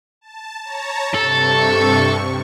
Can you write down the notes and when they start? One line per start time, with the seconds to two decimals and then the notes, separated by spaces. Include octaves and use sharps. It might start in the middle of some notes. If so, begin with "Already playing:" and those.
0.21 A5
0.61 C#5 A5 A#5
1.15 G2 C3 A4 C#6